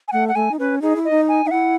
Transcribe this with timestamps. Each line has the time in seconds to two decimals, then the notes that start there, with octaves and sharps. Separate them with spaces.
0.08 G#5
0.12 A3 F#5
0.28 F#5
0.35 A3 G#5
0.51 D#4
0.59 C#4 B4
0.82 D#4 G#4
0.96 E4
1.05 D#5
1.10 D#4
1.28 G#5
1.45 D#4 E5
1.51 E4 F#5